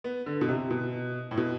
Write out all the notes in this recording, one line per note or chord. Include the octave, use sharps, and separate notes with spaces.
B3
D3
B2
C3
B2
A2
B2